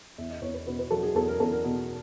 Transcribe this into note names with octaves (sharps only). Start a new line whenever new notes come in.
E2 E5
D#5
E2 C#5
B4
B2 B4
B4
F#3 A4
G#4
E2 A4
A#4
E2 A4
A#4
B2